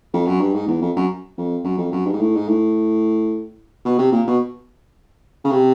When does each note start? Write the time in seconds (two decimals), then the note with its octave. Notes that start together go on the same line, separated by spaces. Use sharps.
0.14 F2
0.27 F#2
0.40 G2
0.54 G#2
0.67 E2
0.81 F2
0.96 F#2
1.38 F2
1.64 F#2
1.78 F2
1.92 F#2
2.05 G2
2.13 G#2
2.20 A2
2.36 G#2
2.48 A2
3.85 B2
3.99 C3
4.12 A#2
4.27 B2
5.45 C#3
5.51 C3